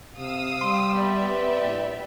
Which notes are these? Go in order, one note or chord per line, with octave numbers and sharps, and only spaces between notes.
C3 F5 D#6 E6
G3 C6
B3 G4 D5 E5
C4 B4
A#1 A2